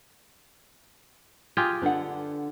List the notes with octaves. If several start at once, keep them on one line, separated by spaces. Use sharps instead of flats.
F4 G4 G#4
D3 D4 B4 F#5